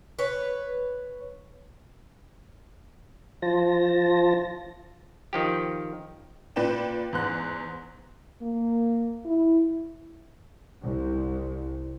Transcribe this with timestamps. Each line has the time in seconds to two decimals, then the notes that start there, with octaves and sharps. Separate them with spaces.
0.19 B4 C#5
3.42 F3 F4 C5 A5 A#6
5.33 D#3 F3 G4
6.56 A#2 B4 D5 G5 E7
7.13 E2 G#2 F#6
8.42 A#3
9.26 E4
10.81 C2